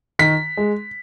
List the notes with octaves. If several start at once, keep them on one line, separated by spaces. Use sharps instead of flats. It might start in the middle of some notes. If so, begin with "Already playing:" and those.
D#3 B6
G#3